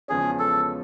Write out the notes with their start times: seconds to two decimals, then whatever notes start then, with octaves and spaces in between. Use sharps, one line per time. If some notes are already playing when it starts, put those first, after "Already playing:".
0.08 E2 C#3 F3 G#3 C#4 G#4
0.39 A4